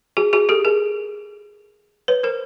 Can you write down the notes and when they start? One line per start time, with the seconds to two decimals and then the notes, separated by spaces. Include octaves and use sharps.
0.17 F#4 G#4
0.33 F#4 G#4
0.49 G4 A4
0.65 G#4 A#4
2.08 B4 C#5
2.23 A#4 C5